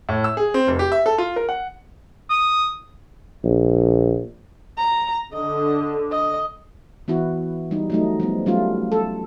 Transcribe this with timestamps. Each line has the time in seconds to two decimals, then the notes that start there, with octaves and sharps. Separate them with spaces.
0.09 A2
0.24 E6
0.37 G#4
0.54 C4
0.68 F1
0.79 G4
0.92 E5
1.06 A4
1.18 F4
1.36 A#4
1.49 F#5
2.30 D#6
3.44 A#1
4.78 A#5
5.33 D3 D#5
6.12 D#5
7.08 E3 B3 E4 F#4
7.71 G3 D#4
7.90 F#3 A3 D#4
8.20 F3 G3 B3
8.46 F#3 G3 A3 C#4 F4
8.92 A4